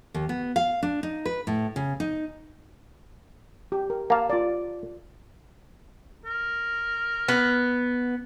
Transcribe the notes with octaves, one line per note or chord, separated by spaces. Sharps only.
D#2
B3
F5
D4
D#4
B4
A2
C#3
D#4
G4
A#4
A#3 F5 A5
F4 D5
A#4
B3